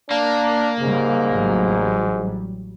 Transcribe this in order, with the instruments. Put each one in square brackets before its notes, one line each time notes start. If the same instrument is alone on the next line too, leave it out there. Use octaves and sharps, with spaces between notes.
[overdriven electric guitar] A#3 [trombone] D4
[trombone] G#2 [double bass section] C#3 G3
[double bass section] A1 F#3 G3